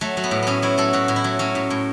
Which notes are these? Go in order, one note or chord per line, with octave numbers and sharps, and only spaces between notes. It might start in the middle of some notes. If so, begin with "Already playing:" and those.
F#3 A3
F#3
B3
A2
A2 B3 C#4
F#3 E4
F#3 A4
A2 F#4
A2
E4
F#3
F#3 C#4
A2
A2